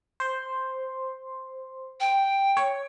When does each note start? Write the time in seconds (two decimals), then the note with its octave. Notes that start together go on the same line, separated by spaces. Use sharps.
0.20 C5 C6
2.00 G5
2.57 C#5